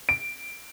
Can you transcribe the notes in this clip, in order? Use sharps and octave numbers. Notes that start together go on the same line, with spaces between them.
D7